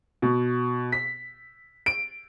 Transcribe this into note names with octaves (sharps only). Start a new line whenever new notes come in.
B2
B6
D7